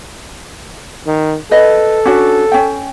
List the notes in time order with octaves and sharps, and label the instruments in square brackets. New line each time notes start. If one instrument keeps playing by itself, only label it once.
[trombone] D#3
[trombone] A4 [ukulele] B4 D#5
[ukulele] C#4 D4 F#4
C#4 G5